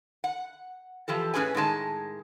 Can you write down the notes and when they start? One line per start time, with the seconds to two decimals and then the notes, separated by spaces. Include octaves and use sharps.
0.24 F#5
1.08 E3 F3 G4 A4
1.34 A2 C#4 G#4 B4 G#5
1.55 A2 D#3 G#3 A5